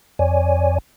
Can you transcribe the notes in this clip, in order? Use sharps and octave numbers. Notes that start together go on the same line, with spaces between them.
F2 C#5 D5 G#5